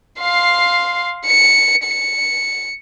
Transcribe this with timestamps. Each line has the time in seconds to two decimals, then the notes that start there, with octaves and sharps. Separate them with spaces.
0.20 F5 C6
1.27 C#7
1.84 C#7